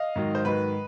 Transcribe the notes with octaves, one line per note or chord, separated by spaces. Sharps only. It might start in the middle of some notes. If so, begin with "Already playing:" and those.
Already playing: D#5 F5
G#2 D#3 F#3
C5
G#2 D#3 F#3 B4